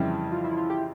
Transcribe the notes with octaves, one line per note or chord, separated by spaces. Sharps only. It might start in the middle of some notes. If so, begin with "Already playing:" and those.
Already playing: F2 C#3 E3 G3 E4
F4
E4
F4
G4